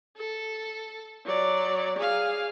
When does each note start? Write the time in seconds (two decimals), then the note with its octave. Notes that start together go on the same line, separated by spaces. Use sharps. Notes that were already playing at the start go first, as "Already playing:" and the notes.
0.17 A4
1.25 F#3 D5
1.99 G#4 F5